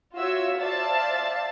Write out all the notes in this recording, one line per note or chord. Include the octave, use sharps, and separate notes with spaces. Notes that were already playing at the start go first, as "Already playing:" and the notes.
F4 F#4 C#5 E5 E6
C5 D5 E5 F5 A5 A6